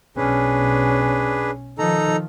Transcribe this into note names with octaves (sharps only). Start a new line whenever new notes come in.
B1 C#4 D4 G#4 B4
D#3 F3 D#4 A4 A#5